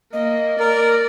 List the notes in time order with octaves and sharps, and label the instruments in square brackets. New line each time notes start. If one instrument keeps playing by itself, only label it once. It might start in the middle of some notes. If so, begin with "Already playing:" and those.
[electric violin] A#3 [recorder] D#5
[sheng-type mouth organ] A#4 [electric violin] D5